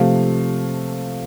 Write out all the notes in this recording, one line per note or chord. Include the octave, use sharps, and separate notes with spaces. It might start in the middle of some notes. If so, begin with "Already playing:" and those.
Already playing: C3 F3 A3 F5